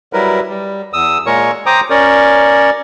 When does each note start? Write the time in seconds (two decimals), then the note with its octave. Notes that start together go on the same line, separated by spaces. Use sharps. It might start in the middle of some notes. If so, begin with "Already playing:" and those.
0.13 F#3 G3 E4 A#4 B4
0.49 G3
0.93 E2 D#6 E6
1.26 A#2 G#3 A#4 C#5 C#6
1.66 C5 G5 A#5 D6 D#6
1.90 C#4 A#4 C#5 D5